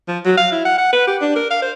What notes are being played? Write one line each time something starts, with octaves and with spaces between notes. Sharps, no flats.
F3
F#3
F5
E4
F#5
F#5
B4
G4
D4
A#4
F5
C5